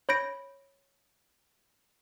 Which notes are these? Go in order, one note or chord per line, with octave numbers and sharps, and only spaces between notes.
C#5 B5 G6 A#6 D7